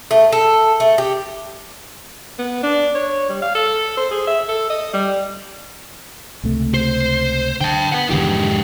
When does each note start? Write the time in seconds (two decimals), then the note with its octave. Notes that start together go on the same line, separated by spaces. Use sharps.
0.11 A3
0.32 A4
0.80 A3
0.98 G4
2.38 B3
2.63 D4
2.95 C#5
3.29 G3
3.42 F5
3.55 A4
3.97 C5
4.11 G#4
4.27 E5
4.49 A4
4.70 D#5
4.94 G3
6.44 C#2 C3 A3
6.74 C5
7.61 D3 G5 A5
7.92 B4 F#5
8.10 F2 G#2 D3 E3 G4